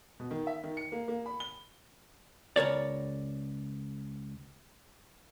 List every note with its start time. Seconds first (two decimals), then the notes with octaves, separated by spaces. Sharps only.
0.20 B2
0.31 D#3
0.47 E5
0.64 D#3
0.77 C#7
0.92 A#3
1.08 A#3
1.26 B5
1.40 G7
2.56 C#2 A#4 C#5 D5